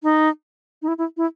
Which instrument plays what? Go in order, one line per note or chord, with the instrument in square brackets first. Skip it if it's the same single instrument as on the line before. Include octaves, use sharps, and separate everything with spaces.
[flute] D#4
D#4
E4
E4
E4